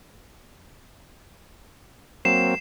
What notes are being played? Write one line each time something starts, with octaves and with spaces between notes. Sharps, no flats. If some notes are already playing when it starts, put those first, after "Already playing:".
F#3 A#3 C4 C7 E7